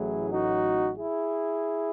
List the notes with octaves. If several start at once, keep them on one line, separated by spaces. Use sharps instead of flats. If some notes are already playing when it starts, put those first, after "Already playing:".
Already playing: A1 A2 F#3 E4 G#4
D#4 F#4
E4 G#4